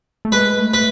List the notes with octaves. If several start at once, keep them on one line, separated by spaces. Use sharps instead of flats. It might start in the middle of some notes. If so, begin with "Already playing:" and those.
A3
G#3 B4
A3
B4